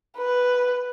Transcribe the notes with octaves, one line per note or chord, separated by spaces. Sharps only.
B4